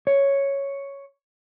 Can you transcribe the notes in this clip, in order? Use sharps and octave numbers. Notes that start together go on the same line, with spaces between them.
C#5